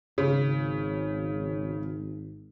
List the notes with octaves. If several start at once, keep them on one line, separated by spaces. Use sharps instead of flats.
G#1 C#3